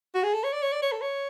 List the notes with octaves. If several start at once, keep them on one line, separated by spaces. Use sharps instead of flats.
F#4
G#4
A4
C#5
D5
C#5
D5
C#5
A4
C#5